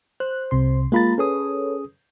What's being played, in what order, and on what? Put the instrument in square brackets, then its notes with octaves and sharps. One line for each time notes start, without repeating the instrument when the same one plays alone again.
[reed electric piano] C5 [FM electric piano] F#6
[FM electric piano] C2 C3 C6
[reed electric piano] G#3 B5 A6 [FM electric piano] A#3 F4 A#5
[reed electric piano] C#4 G#4 D#6 [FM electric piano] A4 B4 C#5